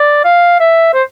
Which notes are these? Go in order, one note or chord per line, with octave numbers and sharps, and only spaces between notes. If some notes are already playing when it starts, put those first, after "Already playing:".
Already playing: D5
F5
E5
C5